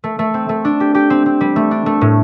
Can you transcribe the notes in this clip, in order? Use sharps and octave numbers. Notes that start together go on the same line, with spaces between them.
A3
A3
C4
A3
D4
G4
G4
C4
C4
G3
A3
D4
A3
A2